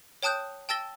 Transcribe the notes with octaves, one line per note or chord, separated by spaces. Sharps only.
C#5 G5 A5 D#6 F#6 G6
G5 A5 E6 A6 A#6 G7